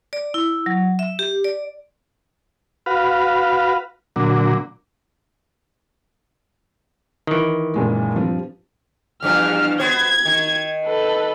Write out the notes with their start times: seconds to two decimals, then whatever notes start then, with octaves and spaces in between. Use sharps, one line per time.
0.13 D5
0.34 E4
0.66 F#3
0.99 E5
1.19 G4
1.44 D5
2.86 F#4 B4 F5
4.16 A#2 D3 F#3
7.27 D#3 E3
7.74 F#1 A#2 G#3
8.16 G2 F3 C4
9.22 E2 G2 F3 F6
9.80 B3 C5 G#6
10.25 D#3
10.85 A4 B4